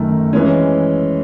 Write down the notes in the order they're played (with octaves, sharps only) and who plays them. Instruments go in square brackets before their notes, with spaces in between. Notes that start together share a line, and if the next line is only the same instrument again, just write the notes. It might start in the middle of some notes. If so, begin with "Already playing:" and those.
Already playing: [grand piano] F#2 D#3 A3
E3 G#3 C#4